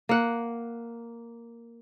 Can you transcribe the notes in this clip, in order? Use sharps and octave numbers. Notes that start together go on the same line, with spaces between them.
A#3 F#5